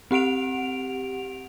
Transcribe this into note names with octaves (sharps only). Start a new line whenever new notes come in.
C4 G4 F#5 D7 F7